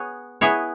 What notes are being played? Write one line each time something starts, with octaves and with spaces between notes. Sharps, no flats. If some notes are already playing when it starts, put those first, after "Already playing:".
Already playing: B3 G#4 C#5
B3 E4 G#4 C#5